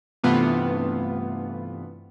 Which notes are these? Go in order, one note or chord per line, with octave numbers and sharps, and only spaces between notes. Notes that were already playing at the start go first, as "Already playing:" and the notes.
G2 C3 E3 A3 B3 F4